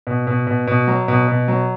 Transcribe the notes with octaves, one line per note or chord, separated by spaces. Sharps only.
B2
B2
B2
B2
F#3
B2
B2
F#3